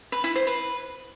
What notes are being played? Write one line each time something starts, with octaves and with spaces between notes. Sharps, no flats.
B4
E4
C5
B4